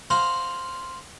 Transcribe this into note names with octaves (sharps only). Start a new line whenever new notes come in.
C5 F5 F#5 G#5 A#5 C6